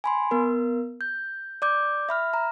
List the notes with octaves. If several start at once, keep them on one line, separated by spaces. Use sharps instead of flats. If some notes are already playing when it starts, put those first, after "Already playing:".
G#5 B5 C6
B3 A#4
G6
D5 D6 G6
E5 B5 F6
A#5